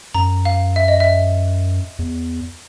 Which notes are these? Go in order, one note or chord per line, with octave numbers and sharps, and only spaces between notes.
F#2 A#5
F5
E5
D#5
E5
E2